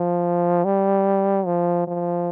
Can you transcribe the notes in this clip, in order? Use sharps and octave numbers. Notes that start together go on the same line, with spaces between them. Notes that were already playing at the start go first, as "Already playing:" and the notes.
Already playing: F3
G3
F3
F3